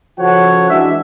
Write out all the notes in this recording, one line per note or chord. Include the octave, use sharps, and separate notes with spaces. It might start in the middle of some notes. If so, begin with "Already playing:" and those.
C#3 F3 F#4 A4 C#5 F#5
E3 G#3 D4 F#4 E5